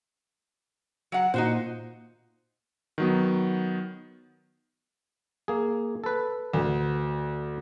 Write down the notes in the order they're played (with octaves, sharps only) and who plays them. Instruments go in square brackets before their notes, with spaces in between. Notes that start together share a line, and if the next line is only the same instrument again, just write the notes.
[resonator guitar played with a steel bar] F#3 F#5
[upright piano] A#2 [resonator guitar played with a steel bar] D#4 F#4 C5
[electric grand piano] D#3 F#3 B3
[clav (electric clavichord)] A#3 G#4
A4 B4
[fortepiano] D2